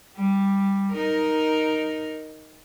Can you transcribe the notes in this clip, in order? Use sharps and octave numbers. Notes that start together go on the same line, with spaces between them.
G3
D#4 A#4